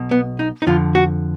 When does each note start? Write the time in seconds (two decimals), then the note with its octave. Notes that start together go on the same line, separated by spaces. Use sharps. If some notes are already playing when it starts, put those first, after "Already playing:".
Already playing: B1 B2
0.11 B3
0.39 D#4
0.62 D#4
0.67 F2 D3 F3 F4
0.95 F#4